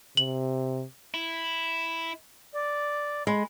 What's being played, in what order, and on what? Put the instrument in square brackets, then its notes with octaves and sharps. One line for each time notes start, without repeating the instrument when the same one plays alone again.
[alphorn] C3 [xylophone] F#7
[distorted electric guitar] E4
[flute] D5
[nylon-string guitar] G#3 [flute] B5